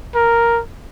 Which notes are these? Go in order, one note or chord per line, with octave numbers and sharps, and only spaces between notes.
A#4